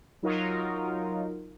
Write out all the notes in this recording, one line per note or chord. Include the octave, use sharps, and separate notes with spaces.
F#3 D#4 F4 A#4